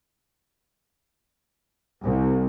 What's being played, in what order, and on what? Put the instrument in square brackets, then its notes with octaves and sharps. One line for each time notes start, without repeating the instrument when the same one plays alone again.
[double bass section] C2